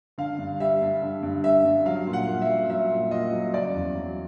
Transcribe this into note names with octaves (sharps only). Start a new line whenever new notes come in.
D3 F5
G2
G3 E5
G2
D3
G2
G3 E5
G2
F#3 F5
A#2
F#5
A#2
E5
F#3
F#3 E5
A#2
A#2 D#5
F#3
C#3 D5
E2
F#3